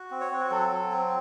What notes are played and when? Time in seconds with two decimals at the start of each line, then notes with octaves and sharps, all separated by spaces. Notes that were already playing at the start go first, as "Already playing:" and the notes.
Already playing: F#4
0.11 C4
0.21 C#5
0.32 C4
0.41 F#4
0.51 F#3 A4
0.72 F#3
0.92 C4